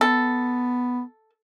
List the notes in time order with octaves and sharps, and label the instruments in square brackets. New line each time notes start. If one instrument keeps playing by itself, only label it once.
[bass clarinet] B3 [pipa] A4